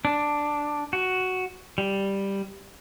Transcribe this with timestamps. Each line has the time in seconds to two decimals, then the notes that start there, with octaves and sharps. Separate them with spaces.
0.05 D4
0.93 F#4
1.78 G3